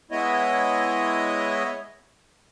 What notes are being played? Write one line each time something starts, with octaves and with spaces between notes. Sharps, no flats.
G#3 B3 E4 C#5 D#5